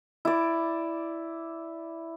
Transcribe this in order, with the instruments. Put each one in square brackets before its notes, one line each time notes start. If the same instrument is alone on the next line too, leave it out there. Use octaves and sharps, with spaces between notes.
[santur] E4 D5